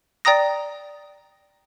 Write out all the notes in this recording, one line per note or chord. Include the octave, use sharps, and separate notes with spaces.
D5 G5 A#5 D#6 A#6